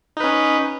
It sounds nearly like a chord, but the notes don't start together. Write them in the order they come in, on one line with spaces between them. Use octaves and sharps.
D#4 B4 C#4